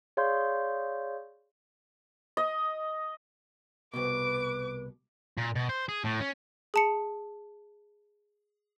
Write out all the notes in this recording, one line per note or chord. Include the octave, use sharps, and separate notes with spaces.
G#4 C#5 D5 F5 C6 G6
D#5
C2 B2 B4 D6
A#2
B2
C5
G#4
A2
C#4
G#4 A5 C#7